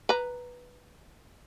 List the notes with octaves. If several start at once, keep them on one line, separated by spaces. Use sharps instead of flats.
B4 A#5